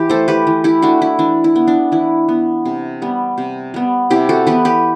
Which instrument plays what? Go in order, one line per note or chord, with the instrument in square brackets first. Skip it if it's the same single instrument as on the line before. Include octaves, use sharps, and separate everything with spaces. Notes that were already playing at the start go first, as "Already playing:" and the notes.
Already playing: [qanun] E3 G4
A3 A4 C5
G4 B4
E3
E4 G4
A3 D4 F#4
E4
E3 D4
E4
B3
D4
E3 E4
B3
C3
G3 B3
C3
G3 B3
C3 E4 G4
F#4 A4
E3 B3 G4 B4
G4 B4